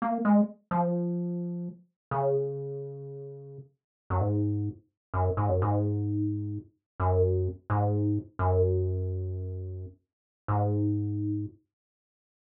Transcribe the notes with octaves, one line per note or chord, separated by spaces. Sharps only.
A#3
G#3
F3
C#3
F#2
G#2
F#2
G#2
F#2
G#2
F#2
G#2
F#2
G#2